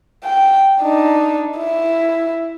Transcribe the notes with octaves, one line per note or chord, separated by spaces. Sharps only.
G5
D4 D#4
E4